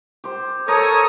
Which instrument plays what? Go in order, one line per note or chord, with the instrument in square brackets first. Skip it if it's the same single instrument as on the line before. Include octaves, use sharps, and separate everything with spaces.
[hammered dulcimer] G4 C5
[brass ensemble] A4 C#5 [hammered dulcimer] A#4 D#5 [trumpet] D#6